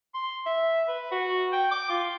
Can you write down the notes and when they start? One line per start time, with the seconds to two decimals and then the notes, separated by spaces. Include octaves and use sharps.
0.14 C6
0.46 E5
0.88 B4
1.11 F#4
1.52 G5
1.71 D6
1.89 F4